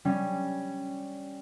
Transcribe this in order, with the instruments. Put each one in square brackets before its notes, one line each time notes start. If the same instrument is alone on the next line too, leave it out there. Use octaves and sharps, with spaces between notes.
[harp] G3 C#4